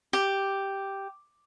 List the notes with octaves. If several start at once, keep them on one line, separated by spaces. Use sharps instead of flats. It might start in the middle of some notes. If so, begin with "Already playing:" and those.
G4